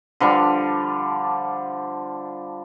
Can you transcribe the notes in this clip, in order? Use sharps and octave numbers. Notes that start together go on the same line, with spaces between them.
D3 F3 G3 D4